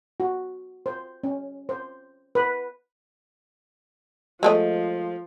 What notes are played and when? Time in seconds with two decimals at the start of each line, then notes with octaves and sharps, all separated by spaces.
0.20 F#4
0.86 C5
1.24 C#4
1.69 C5
2.35 B4
4.43 F3 G#3 A3 D#5